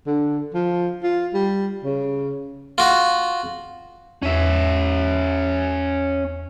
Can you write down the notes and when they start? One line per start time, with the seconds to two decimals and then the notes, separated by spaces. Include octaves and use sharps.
0.07 D3
0.54 F3
1.03 F4
1.34 G3
1.84 C#3
2.78 F4 F#4
4.23 E2 C#4 E5